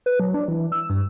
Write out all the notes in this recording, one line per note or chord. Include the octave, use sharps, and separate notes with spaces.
B4
F#3
D4
E3
E6
G2